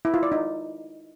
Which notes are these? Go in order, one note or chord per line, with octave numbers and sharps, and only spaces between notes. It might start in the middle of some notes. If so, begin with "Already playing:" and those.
E4
F4
D5
D#4